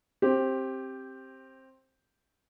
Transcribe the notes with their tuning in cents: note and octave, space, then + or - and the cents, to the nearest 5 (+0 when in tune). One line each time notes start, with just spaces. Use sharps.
C4 +15 G4 +0